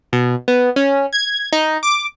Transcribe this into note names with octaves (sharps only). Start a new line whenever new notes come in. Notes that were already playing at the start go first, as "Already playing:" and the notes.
B2
B3
C#4
G#6
D#4
D6